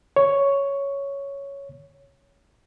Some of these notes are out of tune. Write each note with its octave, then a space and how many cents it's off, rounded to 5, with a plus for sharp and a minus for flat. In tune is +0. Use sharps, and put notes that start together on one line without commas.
C#5 +5